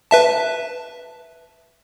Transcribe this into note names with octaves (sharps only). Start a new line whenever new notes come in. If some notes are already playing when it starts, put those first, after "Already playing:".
B4 E5 A5